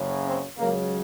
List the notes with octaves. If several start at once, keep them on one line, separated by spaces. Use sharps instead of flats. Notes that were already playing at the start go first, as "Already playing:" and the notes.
Already playing: F#1 F#2 C#3
C4
C#2 C#3 F#3 A#3